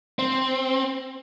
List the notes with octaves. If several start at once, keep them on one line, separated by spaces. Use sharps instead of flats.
C4